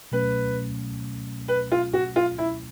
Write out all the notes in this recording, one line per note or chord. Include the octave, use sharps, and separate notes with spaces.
B2 F#3 A3 C#4 B4
B4
F4
F#4
F4
E4